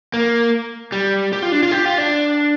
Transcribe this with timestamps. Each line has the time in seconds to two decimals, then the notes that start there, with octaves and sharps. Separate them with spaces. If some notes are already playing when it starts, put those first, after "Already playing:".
0.14 A#3
0.92 G3
1.33 G4
1.42 F4
1.52 D4
1.63 F4
1.71 G4
1.85 F4
1.98 D4